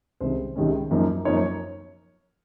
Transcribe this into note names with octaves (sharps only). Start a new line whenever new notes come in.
C2 C3 D#3 G#3 C#4 C5
C2 C3 D#3 G#3 C#4
F#2 F3 A#3 D#4
F#2 F3 A#3 D#4 C#5
C#5